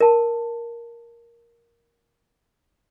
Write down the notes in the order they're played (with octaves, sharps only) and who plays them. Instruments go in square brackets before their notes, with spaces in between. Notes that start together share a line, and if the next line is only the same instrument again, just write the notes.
[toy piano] A#4 A5